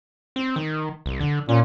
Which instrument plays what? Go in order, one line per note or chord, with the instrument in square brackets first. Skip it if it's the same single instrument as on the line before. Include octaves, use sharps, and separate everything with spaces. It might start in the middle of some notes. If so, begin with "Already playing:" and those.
[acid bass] C4
D#3
C2
D3
[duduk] A#2 [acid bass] C#4